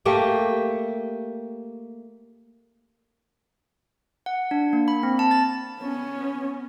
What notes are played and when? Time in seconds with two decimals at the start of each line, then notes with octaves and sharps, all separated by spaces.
0.05 A3 A#3 G4 G5
4.26 F#5
4.51 D4
4.73 A#3
4.88 B5
5.03 C4
5.19 A5
5.31 A6
5.81 B3 C#4